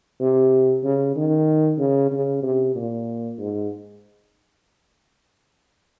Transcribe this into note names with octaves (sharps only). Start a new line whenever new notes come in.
C3
C#3
D#3
C#3
C#3
C3
A#2
G#2